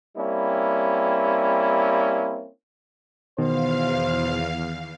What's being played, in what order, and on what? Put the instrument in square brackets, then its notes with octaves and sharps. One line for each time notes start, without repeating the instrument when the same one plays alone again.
[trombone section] G3 A#3 C4 C#4 E4
[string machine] E2 F5 [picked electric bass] B2 [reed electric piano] D#3 [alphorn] C5